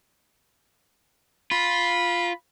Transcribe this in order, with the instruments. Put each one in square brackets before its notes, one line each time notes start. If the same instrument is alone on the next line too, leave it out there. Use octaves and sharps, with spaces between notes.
[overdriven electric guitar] F4 [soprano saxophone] B5